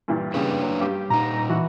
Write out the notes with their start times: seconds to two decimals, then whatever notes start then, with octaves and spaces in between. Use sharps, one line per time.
0.08 G2 A#2 E3
0.34 G2 C#3 A#3 D4 B4
0.62 F#3
0.80 G2 G4 F5
1.10 A#2 D#4 A#5
1.50 E3 F#4